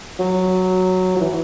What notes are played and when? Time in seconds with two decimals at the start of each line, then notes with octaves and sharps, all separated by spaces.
0.20 F#3
1.17 F#3
1.21 E3